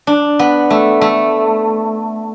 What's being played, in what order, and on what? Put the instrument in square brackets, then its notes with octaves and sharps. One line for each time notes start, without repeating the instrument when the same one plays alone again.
[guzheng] D4
B3
A3
A3